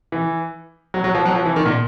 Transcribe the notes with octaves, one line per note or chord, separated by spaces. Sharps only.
E3
F#3
F#3
F3
F#3
F3
E3
D#3
A#2